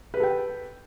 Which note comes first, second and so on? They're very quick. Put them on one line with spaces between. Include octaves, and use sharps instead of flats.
B4 G4 A4 G5